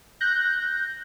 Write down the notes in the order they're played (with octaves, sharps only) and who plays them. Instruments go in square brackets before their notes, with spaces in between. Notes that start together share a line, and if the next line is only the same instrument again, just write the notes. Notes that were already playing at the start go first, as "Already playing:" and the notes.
[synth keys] F#6 G6 A#6